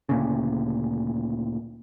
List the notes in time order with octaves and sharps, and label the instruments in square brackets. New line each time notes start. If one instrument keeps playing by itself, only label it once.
[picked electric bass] D2 A#2 C#3